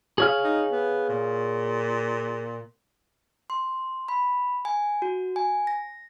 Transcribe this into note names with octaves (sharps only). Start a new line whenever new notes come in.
G#4 C#5 F5
D#4
B3
A#2
C6
B5
G#5
F#4
G#5
A#6